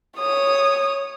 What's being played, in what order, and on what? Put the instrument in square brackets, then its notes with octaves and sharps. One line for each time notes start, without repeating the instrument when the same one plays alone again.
[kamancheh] C#5 D#6